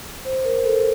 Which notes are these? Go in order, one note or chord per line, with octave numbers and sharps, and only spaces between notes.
C5
A#4
A4